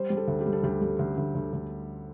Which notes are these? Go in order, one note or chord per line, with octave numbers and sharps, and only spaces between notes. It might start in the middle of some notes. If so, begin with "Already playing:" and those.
Already playing: G3 C5
G3
A4
D2
G4
G3
A4
D2 G4
G3
D2
D2
D2
D2